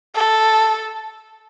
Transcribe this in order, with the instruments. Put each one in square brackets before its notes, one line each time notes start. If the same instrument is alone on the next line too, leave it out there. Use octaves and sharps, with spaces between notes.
[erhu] A4